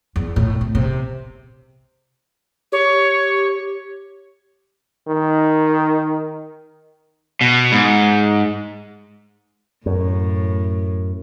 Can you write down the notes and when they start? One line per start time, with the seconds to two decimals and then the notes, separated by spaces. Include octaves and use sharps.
0.16 E2
0.36 A2
0.61 C3
0.75 C3
2.72 G4 C#5
5.08 D#3
7.41 B2
7.72 G#2
9.86 F#2 A2